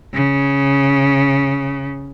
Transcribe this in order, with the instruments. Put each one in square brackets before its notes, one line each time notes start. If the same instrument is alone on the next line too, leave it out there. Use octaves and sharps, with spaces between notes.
[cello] C#3